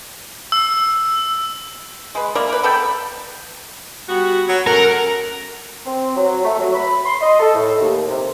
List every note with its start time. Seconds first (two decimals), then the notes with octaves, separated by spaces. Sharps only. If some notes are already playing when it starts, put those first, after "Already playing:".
0.52 E6
2.15 G#3 B4
2.35 A#3 A#4 D5 E5
2.49 A#4 B4
2.63 B3 A4 D5 G5
4.09 G3 B3 F#4
4.48 F#3
4.67 F#2 A4 A#4 F#5
5.86 C4
6.16 F#3
6.44 A3
6.59 F#3
6.75 B5
7.06 C6
7.21 D#5
7.40 A4
7.55 A2
7.80 D#2
8.08 C3